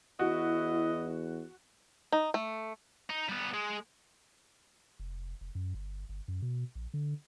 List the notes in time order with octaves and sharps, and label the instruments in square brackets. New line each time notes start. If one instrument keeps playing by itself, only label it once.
[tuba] E2 [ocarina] E4 [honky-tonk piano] F#4 [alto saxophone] D#5
[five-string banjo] D#4
A3
[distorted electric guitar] D#4
G3 B3
G#3
[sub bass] F1
F1
F#2
G1
G1
F#2
B2
A#1
D3